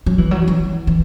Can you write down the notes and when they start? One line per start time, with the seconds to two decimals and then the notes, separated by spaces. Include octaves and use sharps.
0.06 F#3
0.18 E3
0.31 F#3
0.48 E3
0.87 E3